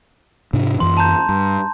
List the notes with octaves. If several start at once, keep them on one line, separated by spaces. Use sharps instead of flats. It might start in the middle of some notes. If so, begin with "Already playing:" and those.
G#2 C3 D4
F#2 E3 C6
A5 A#5 G6
G2